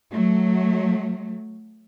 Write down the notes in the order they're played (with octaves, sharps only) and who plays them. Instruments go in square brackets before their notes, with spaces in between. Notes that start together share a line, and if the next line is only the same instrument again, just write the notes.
[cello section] F#3 A3